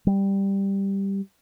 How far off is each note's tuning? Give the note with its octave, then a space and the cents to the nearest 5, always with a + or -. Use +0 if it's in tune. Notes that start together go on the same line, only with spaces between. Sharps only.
G3 +5